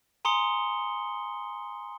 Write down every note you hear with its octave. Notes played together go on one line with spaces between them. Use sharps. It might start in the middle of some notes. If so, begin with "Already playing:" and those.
G#5 A#5 C6 D#6 C#7 G7